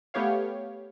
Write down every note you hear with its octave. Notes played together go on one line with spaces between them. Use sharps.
A3 B3 G4 C#5 F5